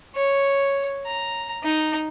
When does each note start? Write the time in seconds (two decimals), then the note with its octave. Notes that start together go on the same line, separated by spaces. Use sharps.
0.15 C#5
1.07 A#5
1.64 D#4